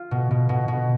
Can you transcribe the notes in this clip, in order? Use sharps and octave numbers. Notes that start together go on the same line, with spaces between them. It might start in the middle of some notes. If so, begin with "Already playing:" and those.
Already playing: F4
B2
B2
B2
B2